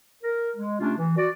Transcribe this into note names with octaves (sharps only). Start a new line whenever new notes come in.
A#4
G#3
C3 A3 C#4 D4 F4
E3
F#4 D5